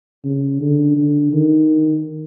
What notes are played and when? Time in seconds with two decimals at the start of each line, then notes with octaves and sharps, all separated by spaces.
0.25 C#3
0.61 D3
0.97 D3
1.33 D#3